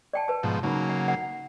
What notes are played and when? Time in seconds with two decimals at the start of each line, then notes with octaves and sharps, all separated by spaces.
0.13 D5 G5 A5
0.28 B4 A5
0.43 G#2 B2 F3
0.63 C#3 F#3 A#3 D#4 B5
0.89 F#5
1.08 F#5